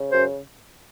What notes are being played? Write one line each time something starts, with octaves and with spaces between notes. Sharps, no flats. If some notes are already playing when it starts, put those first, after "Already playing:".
Already playing: C#3
F#2 C5